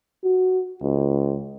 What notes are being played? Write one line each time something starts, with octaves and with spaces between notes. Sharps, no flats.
F#4
C#2